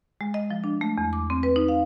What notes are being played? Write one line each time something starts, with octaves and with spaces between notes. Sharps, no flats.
G#3
D#5
F3
D4
A3
E2
D6
C4
B4
D#4
F5